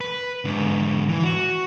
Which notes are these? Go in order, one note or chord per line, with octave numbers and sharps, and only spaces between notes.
B4
G#2 D3
E3
F#4